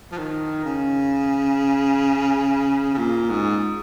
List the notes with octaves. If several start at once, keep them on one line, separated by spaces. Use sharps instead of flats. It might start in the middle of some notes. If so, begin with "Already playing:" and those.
F3
D#3
C#3
C#3
A#2
G#2